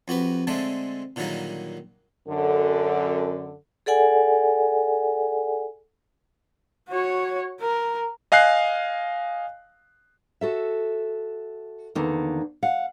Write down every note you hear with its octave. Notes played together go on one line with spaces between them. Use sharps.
F2 F#4 G4 B4
D3 G#3 A3 C4 D4
A#2 D3 D#3 F#3 G3 A#3
F#2 D3 A4
G#4 A4 D5 F#5 G#5
F#4 C#5
A#4
D#5 F5 G#5 F#6 C7
F#4 A4 E5
E2 D3 D#3 A#3
F5 F#5